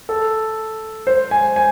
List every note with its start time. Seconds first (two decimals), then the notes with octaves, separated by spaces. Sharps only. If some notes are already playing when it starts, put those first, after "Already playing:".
0.09 A4
1.07 C5
1.31 G#5
1.56 G#5